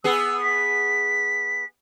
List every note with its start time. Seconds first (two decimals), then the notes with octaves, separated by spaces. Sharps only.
0.04 B3 G#4 E6
0.42 B6